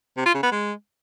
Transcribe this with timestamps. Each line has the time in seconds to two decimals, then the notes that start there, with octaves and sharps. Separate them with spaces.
0.17 C3
0.26 F4
0.34 C#3
0.43 B3
0.52 G#3